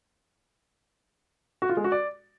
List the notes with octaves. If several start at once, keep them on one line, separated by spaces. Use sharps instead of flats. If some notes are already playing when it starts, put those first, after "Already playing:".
F#4
F4
G#3
F#4
D5